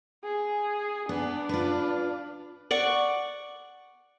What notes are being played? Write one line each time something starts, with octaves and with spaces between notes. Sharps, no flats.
G#4
B3 D4
F4 B4
D5 F#5 C#6